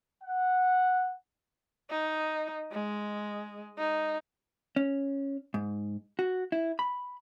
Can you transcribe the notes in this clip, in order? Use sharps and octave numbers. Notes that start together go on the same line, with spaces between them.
F#5
D#4
G#3
D#4
C#4
G#2
F#4
E4
B5